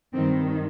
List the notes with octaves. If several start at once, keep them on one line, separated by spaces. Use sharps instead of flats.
G2 D#3 C4